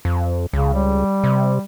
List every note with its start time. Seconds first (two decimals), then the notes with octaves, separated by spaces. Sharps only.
0.05 F2
0.53 C#2 C#3
0.73 G3
1.24 C3